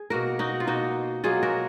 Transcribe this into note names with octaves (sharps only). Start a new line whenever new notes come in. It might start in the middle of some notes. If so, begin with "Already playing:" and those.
Already playing: G#4
B2 A#3 F#4 A#4
D#4 F#4
F4
B2 A#3 D#4 F#4
B2 F#3 A#3 F4 G#4
F#4 A#4